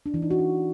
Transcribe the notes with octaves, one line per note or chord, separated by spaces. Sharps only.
D4
E3
D#4
F#4
D4